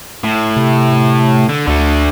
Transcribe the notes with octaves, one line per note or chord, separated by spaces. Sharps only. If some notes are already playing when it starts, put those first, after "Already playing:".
A2
C3
D3
D2 D3 A3